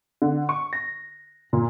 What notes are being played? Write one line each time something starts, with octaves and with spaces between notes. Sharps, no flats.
D3
C#6
A#6
A#2